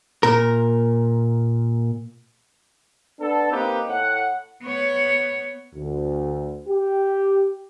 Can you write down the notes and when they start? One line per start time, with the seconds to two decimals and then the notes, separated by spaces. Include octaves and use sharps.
0.23 A#2 A#4
3.20 B3 D4 A4
3.51 A#3 C4 D#4 G4 B4
3.88 A2 F#5
4.63 B3 C#5
5.75 D2
6.69 G4